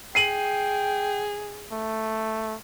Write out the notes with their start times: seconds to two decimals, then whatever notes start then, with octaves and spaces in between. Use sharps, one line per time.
0.15 G#4 G5 C7 D#7 F#7
1.72 A3